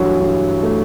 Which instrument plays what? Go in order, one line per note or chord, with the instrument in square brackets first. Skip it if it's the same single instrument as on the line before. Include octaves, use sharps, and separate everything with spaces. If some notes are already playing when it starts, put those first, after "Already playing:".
Already playing: [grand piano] G2 E3 A3 [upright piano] F#3
[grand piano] G2
A3